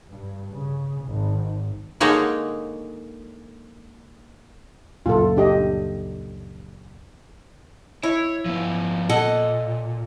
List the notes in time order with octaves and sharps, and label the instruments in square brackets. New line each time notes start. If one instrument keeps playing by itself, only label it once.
[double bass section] G2
C#3
G#1
[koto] D3 G#3 A#3 D#4 C#5 F#5
[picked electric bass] C#2 F#2 A#2 [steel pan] F4 A4
[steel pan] D4 G4 D#5
[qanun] E4 [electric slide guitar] C#5
[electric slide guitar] F3 B3
[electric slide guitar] A#2 [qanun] A4 D#5 F#5